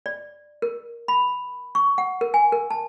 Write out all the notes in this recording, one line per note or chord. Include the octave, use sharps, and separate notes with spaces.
D5
A#4
B5
C#6
F#5
A#4
G#5
A#4
A5